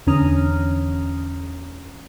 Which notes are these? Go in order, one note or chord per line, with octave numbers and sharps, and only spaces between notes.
E2 D3 C#4 A#5 D#6 F6